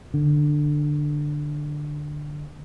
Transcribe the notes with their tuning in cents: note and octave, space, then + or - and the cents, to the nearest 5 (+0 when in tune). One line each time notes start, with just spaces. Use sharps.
D3 +10